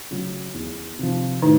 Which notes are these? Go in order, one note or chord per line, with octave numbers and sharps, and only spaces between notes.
C#3 F#3
E2
C3 F3
A2 D#3 D#4